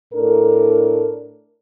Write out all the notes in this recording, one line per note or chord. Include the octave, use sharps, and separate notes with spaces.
A2 D4 A4 A#4